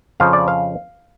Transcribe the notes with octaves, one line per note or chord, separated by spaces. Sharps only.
F2 C#3 F3 F5
D5
F5